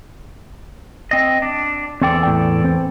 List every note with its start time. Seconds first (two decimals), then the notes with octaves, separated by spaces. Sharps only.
1.11 C4 D#5
1.42 D4
2.01 E2 C4 A4 D5 G5
2.23 A2 G5
2.64 C4